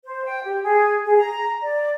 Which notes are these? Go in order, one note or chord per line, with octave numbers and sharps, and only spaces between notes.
C5
G5
G4
G#4
G#4
A#5
D5